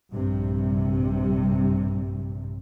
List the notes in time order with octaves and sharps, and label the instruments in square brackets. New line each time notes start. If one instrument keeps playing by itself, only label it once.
[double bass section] A#1 G2 C3 G3